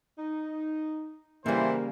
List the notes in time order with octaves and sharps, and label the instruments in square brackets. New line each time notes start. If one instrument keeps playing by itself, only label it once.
[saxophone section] D#4
[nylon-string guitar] C#3 G3 [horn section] E3 E4 C5 [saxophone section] A#3